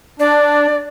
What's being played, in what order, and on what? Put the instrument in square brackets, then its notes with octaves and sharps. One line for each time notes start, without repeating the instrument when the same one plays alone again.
[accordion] D4 [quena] D5